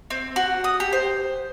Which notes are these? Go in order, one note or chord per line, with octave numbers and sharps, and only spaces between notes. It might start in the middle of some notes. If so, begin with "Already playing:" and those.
C4
F#4
D#6
G4
C5